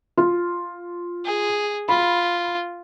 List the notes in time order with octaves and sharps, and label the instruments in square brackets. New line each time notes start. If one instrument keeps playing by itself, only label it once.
[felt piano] F4
[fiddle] G#4
[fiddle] F4 [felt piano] B5